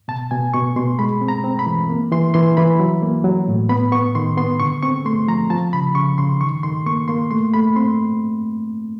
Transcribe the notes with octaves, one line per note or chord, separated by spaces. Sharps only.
B2 A5
B2 G#5
B2 C#6
B2 C6
G#3 B5
C4
A#5
C4
B5
E3
A#3
E3 C6
E3 C6
E3 B5
F#3
A#3
F#3
A2
B3 B5
B3 C#6
D#3 C6
B3 C6
D3 C#6
C4 C#6
A3 C6
F3 A#5
F3 A5
C#3 B5
C#3 C#6
C#3 C6
D#3 C#6
D#3 C6
A#3 C#6
A#3 C6
A3 C6
A3 B5
C4 C6